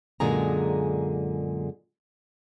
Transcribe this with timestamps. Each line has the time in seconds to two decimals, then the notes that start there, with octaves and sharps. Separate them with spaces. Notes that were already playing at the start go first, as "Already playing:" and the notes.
0.20 F#2 A#2 D3 G#3 G#4 A#5